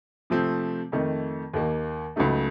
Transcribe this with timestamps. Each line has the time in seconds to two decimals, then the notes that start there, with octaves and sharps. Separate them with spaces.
0.30 C3 F3 A3 C4
0.92 F2 D#3 A3
1.53 D#2 D#3 A#3
2.16 C#2 C#3 F#3 A3 D#4